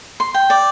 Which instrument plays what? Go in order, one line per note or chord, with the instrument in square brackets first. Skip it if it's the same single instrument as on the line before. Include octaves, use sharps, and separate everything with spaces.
[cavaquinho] C6
G5
D5